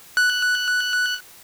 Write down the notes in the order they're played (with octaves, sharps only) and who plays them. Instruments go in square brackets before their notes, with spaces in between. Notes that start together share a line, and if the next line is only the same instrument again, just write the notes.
[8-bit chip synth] F#6